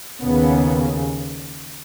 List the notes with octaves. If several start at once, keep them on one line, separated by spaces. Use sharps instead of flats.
D#2 C#3 B3